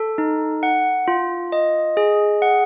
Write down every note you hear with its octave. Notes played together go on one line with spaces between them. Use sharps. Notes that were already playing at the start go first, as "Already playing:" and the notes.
Already playing: A4
D#4
F#5
F4
D#5
G#4
F#5